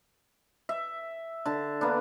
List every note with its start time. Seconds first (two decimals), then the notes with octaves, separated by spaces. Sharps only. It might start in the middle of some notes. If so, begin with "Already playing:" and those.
0.69 E5
1.46 D3 A5
1.81 A#3 B3 D4